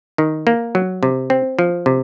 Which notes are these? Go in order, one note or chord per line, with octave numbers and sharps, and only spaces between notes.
D#3
A#3
F#3
C3
C4
F3
C3